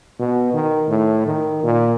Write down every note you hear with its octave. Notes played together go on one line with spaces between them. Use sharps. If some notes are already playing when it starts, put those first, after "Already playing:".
B2
D#3
A2
D#3
A#2